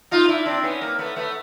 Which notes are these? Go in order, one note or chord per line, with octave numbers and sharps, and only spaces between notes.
D#4 F4
D4 E4
C4 D4
B3 C#4
A#3 C4
A3 B3
A3 B3